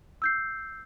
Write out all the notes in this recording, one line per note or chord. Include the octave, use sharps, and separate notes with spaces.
E6 G6 C7